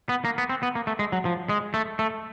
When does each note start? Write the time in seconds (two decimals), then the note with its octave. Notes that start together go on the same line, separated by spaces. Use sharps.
0.09 B3
0.25 A#3
0.38 B3
0.49 C4
0.63 B3
0.75 A#3
0.87 A3
0.99 G#3
1.12 F#3
1.25 F3
1.49 G#3
1.74 A3
1.99 A3